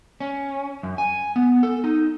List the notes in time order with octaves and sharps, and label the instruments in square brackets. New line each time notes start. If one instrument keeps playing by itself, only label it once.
[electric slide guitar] C#4
F#2
G#5
B3
A4
D#4